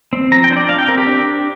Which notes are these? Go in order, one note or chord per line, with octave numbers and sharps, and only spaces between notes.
C4
F3 A#5
G5
D4 C5
D5
C4 F5
G5
C4 A#4
G4
D4